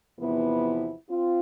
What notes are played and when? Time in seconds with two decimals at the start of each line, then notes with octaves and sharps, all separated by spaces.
0.19 E2 C3 F3 B3 E4
1.10 C4 F4